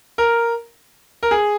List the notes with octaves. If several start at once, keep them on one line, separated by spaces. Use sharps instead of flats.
A#4
A#4
G#4